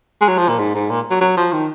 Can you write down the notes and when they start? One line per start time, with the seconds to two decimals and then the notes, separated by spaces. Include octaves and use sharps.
0.21 G#3
0.28 F#3
0.38 F3
0.48 A#2
0.59 G#2
0.75 G#2
0.90 A#2
1.10 F#3
1.21 F#3
1.37 F3
1.53 D#3